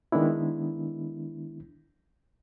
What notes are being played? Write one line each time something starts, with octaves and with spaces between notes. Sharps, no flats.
D#3 G#3 B3 D4 E4